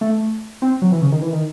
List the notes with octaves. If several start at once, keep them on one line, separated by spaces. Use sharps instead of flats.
A3
C4
F#3
E3
C#3
D#3
E3
D#3